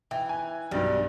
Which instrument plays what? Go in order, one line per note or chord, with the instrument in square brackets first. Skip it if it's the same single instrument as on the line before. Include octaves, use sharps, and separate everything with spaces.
[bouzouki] E3 [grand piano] G5
[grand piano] G#5
[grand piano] B1 G2 [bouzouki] G3